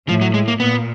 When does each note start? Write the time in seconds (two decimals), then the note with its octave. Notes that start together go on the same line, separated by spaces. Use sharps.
0.08 A2 F3
0.21 F#3
0.34 G#3
0.48 A#3
0.60 A#2 B3